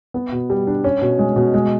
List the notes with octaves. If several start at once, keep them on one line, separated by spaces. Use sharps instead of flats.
B3
B2
G3
D4
C#4
B2
G#3
B2
G#3